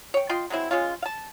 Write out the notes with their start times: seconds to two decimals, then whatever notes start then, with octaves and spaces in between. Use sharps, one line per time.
0.14 C#5 G5
0.29 F4 D#5 G5 C6
0.50 F#3 G#3 C4 E4
0.71 G#3 C#4 F4
1.02 F5 A5